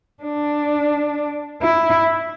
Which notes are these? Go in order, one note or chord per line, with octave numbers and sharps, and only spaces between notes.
D4
E4